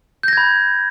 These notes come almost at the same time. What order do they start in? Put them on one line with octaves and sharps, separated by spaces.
G6 A#6 G#6 B5